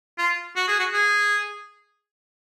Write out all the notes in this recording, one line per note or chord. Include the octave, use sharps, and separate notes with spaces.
F4
F#4
G#4
F#4
G#4